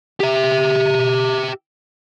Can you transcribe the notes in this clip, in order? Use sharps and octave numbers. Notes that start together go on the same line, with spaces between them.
G4 E5